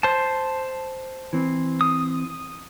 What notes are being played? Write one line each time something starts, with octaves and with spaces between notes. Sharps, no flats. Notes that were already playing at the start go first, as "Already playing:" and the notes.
C5 A5
E3 C4
D#6